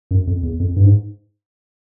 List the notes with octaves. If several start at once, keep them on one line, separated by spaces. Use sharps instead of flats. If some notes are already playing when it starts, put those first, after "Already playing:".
F#2
F2
E2
F2
G2
G#2